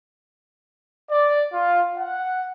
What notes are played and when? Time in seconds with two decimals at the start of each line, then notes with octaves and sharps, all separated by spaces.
1.09 D5
1.52 F4
1.97 F#5